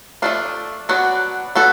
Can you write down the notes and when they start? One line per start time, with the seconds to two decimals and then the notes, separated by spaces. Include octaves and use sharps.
0.22 F3 A3 D4 F4
0.89 F#3 B3 D4 F#4
1.55 F#3 B3 F#4 A4